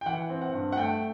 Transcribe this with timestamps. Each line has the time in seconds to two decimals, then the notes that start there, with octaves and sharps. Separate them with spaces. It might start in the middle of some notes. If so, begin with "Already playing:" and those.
0.01 G5
0.06 E3 F#5
0.30 C4
0.42 F#5
0.53 G2
0.72 F#5
0.77 A3 G5